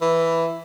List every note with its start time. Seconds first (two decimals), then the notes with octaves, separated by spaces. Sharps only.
0.01 E3